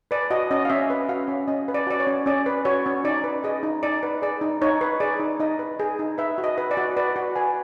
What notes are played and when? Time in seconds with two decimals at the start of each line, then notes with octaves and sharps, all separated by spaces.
0.11 B4 D5
0.31 F#4 D#5
0.51 C#4 D#5
0.65 F5
0.70 C#4 E5
0.90 B4
1.09 F#4 F5
1.28 C#4
1.48 C#4 D#5
1.68 B4
1.74 D5
1.87 F#4 D5
2.00 C#5
2.07 C#4
2.26 C#4 D5
2.46 B4
2.65 F#4 C#5
2.86 C#4
3.04 D#4 D5
3.24 B4
3.44 G#4 D#5
3.63 D#4
3.83 D#4 D5
4.03 B4
4.22 G#4 D5
4.41 D#4
4.62 D#4 C#5
4.81 B4
5.00 G#4 D5
5.20 D#4
5.40 D#4 D#5
5.59 B4
5.80 G#4
5.99 D#4
6.18 B4 E5
6.38 F#4
6.44 D#5
6.58 B4
6.71 D5
6.77 F#4
6.97 B4 D5
7.16 F#4
7.35 B4 G#5